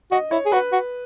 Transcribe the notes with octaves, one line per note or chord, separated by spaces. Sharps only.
F#4 D#5
E4 C#5
G#4
F#4 B4
F#4